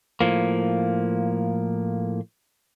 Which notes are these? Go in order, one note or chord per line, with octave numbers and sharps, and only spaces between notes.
A2 F3 A#3